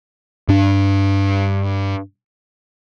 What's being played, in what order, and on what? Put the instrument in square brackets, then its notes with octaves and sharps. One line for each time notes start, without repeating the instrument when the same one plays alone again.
[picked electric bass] G2 D4